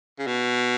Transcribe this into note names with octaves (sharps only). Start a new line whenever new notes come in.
C#3
B2